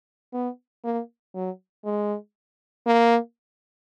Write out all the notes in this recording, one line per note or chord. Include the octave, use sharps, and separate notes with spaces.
B3
A#3
F#3
G#3
A#3